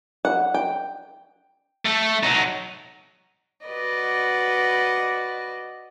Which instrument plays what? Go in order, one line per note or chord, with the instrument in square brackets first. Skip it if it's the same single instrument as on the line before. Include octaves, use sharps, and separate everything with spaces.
[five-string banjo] F#5
G5
[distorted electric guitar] A3 A4
F#3 D#4
[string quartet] F#4 B4 D5 D#5